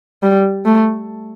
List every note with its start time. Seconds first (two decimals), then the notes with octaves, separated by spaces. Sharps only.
0.23 G3
0.65 A3